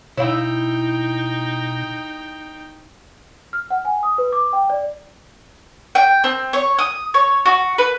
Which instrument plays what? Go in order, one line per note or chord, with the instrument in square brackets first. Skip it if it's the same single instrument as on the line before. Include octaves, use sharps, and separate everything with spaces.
[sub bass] B2 [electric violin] D#4 G5 [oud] E4 [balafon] C#5 F5
[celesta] F6
F#5
G#5
D#6
B4
D6
G5
D5
[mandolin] G5
C4
C#5
D#6
C#5
F#4
B4